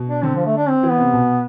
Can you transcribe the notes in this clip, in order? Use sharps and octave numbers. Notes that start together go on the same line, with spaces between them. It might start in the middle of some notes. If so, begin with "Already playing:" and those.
Already playing: B2
D4
D3 C4
F3
A3
D4
C4
E3
B3
C3
B2